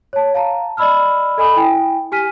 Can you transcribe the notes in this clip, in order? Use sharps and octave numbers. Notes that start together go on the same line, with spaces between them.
C#5 A5
F5 A5 A#5
D5 D#5 B5 E6 F6
A4 D#5 G#5 B5 D#6
E4 G5 G#5
G4 G#5 F6 B6 D#7